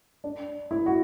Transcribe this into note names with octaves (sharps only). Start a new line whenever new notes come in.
D4
E4
F#4